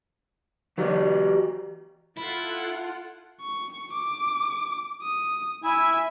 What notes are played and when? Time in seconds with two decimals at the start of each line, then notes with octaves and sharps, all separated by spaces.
0.78 E3 F#4 G4
2.17 E4 F4 A4 F#5
3.41 C#6
3.93 D6
5.03 D#6
5.64 E4 E5 G#5